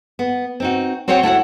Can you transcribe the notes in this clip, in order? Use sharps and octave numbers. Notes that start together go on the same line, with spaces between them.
B3
C4 D#4 F#4
C4 F#4 C5 C#5 F#5 G5
A3 E4 F#4 F#5